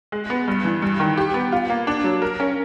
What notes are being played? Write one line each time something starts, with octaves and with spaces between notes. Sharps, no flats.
G#3
B3
G2
E3
G2
D#3
G4
B3
F4
A#3
D4
F#3
A#4
C#4